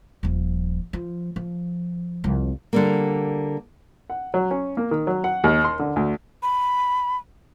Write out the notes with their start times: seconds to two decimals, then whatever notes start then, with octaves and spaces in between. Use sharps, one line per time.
0.23 D#1 F3
0.93 F3
1.36 F3
2.24 C2 F2
2.73 D3 G3 A#3
4.10 F#5
4.34 F#3
4.51 C#4
4.77 A#3
4.91 D#3
5.07 F#3
5.24 F#5
5.44 D#2
5.64 C6
5.79 D3
5.96 D2
6.43 B5